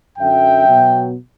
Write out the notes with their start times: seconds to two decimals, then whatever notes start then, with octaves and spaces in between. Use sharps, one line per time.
0.18 F#2 D3 F#3 E5 G5
0.66 B2 F#3 B3